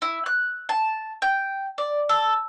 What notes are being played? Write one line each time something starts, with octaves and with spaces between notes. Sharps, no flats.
E4
F#6
A5
G5
D5
A4